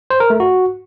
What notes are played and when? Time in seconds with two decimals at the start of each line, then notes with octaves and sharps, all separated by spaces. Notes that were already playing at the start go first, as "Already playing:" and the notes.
0.10 C5
0.20 A#4
0.30 A3
0.40 F#4